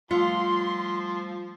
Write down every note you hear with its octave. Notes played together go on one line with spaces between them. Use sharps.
F3 G3 A3 F4 C6 E6